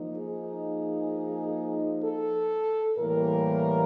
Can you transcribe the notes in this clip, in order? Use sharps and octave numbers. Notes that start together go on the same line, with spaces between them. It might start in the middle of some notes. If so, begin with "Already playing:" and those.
Already playing: F3 A#3 D#4
G#4
A4
A2 E3 G3 A#3 A#4